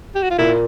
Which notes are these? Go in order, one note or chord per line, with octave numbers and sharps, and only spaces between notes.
G4
F#4
F4
A#2 A#3 E4